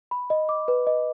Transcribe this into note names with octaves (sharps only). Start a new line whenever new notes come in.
B5
D#5
D6
B4
D#5